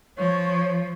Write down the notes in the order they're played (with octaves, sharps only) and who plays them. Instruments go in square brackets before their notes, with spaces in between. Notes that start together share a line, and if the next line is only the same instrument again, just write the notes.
[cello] F3 [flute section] C#5 C#6